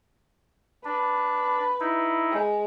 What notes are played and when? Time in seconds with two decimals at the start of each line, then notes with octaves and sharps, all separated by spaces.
0.85 D4 B4
1.80 D#4 E4
2.31 G#3